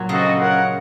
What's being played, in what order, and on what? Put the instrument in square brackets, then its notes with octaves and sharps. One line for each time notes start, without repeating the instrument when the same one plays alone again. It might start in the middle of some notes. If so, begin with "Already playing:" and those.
Already playing: [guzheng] A#2 F#3
[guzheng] C#3 [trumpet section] C4 F#4 A4 D#5
[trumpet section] F4 A#4 C#5 F#5